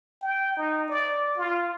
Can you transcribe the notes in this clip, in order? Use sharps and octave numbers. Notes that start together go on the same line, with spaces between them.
G5
D#4
D5
F4